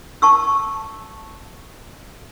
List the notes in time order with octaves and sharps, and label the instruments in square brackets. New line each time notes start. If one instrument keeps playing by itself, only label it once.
[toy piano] A5 C#6 E6